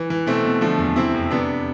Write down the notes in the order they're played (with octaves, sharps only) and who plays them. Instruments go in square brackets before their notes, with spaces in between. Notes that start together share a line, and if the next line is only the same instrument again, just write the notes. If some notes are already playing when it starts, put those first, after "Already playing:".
Already playing: [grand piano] E3
E3
B2 A3 C4
B2
D3 F3 A3
E2
C3 C4 E4
F2
C3 B3 D4